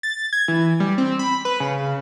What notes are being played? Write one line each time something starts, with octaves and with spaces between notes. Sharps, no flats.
A6
G#6
E3
G3
C4
B5
B4
C#3